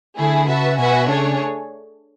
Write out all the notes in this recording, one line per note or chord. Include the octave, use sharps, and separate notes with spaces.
D3 A3 E4 G#4
C#3 F#4 B4 E5 A5
B2 F#4 B4 E5 G#5
C#3 A3 D4 G#4 C#5